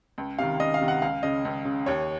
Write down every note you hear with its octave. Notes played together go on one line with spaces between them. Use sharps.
C#2
C3 D#3 F5
C#2 D#5
F5
C3 D#3
F#5
C#2 F5
C#3 D#5
C#2
C#3
D#2 C#5